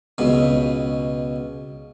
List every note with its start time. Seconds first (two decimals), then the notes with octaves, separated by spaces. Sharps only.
0.18 C#2 B2